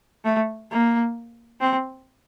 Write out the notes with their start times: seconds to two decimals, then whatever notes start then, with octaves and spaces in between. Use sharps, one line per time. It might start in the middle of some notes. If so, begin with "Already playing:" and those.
0.24 A3
0.71 A#3
1.60 C4